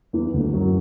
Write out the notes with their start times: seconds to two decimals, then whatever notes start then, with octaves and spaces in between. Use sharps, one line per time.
0.13 E2 E3
0.34 D2 D3
0.53 F#2 F#3